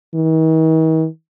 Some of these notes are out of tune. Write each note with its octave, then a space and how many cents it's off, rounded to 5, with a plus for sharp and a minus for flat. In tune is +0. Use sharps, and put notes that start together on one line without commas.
D#3 +45